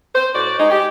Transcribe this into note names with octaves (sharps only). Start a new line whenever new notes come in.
C5
A2 F#4 D5
G#3 D#4
G4